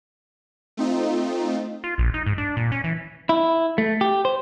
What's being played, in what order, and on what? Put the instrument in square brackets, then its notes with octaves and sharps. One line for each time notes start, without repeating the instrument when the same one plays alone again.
[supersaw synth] A3 C4 D#4 F4
[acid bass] F4
A#1
D#4
G#2
D4
A#2
C#4
E3
[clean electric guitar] E4
A3
G4
C5